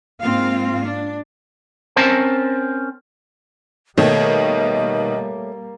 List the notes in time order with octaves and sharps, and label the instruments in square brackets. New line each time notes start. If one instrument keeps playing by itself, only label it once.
[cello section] G#2 A#3 C4 F4 F5
D4
[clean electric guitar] C4 C#4 A#4 C5 A5
[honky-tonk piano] B2 D#3 [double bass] G3 A#3 [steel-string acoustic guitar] A3 C#5 [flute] D#5